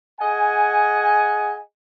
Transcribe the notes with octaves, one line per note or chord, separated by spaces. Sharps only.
G#4 D#5 F#5 G#5